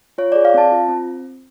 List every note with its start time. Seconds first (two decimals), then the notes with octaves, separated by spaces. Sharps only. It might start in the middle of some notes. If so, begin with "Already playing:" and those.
0.18 F4 C#5
0.32 D5
0.36 G#4
0.45 F5
0.54 C4 A5
0.72 F4
0.89 C4